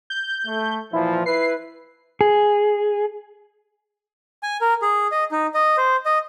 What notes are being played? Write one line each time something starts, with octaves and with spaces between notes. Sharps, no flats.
G6
A3
A#2 E3 F3 E4
E4 B4 C7
G#4
G#5
A#4
G#4
D#5
D#4
D#5
C5
D#5